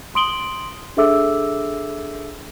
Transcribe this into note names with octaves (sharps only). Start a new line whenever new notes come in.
C6 D#6 D7 F#7 G7
D4 G#4 A4 E5 D6 E6